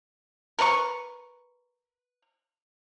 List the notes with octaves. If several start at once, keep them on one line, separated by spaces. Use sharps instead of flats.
A#4 B4 A5 C#6